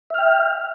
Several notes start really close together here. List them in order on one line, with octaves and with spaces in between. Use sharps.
E5 F6 G5